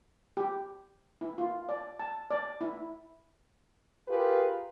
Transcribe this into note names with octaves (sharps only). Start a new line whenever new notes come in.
G4
E4
F4
D5
A5
D5
E4
F4 G4 G#4 A#4 B4